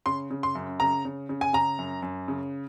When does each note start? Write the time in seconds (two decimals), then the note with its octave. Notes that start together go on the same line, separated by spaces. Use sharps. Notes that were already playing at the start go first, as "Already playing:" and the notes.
0.06 C#3 C6
0.31 C#3
0.43 C6
0.55 F#2
0.80 C#3 A#5
1.05 C#3
1.29 C#3
1.41 G#5
1.53 C#3 A#5
1.79 F#2
2.02 F#2
2.28 C#3